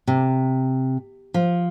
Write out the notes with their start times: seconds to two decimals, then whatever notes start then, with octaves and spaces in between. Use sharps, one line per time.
0.07 C3
1.34 F3